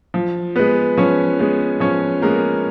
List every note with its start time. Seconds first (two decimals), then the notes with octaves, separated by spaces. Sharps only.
0.14 F3
0.56 G#3 B3 B4
0.97 F3 C#4 C#5
1.39 G#3 B3
1.80 F3 C#4 C#5
2.22 G#3 A#3 B3 A#4